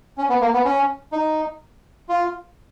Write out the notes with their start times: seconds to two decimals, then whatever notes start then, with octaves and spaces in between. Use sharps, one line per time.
0.18 C#4
0.29 B3
0.41 A#3
0.54 B3
0.65 C#4
1.12 D#4
2.09 F4